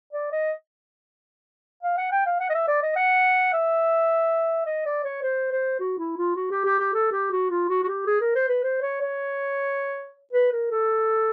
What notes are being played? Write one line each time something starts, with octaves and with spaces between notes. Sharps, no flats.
D5
D#5
F5
F#5
G5
F5
F#5
D#5
E5
D5
D#5
F#5
E5
D#5
D5
C#5
C5
C5
F#4
E4
F4
F#4
G4
G4
G4
A4
G4
F#4
F4
F#4
F#4
G4
G#4
A#4
C5
B4
C5
C#5
C#5
B4
A#4
A4